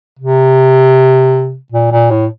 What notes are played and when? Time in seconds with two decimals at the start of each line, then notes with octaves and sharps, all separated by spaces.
0.19 C3
1.72 A#2
1.92 A#2
2.11 A2